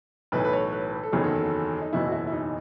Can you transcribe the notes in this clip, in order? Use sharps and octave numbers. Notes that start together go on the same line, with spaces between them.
B1 A2 E3 B4
B4
C#5
B4
B4
A4
F#1 E2 D#3 F#3 G#4
A4
D#4
F#1 E2 B2 F#3 E4
F#4
E4
E4
D#4